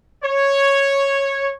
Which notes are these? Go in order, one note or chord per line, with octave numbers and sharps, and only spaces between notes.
C#5